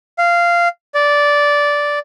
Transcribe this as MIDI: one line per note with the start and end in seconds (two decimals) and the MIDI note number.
0.18 0.68 77
0.95 1.99 74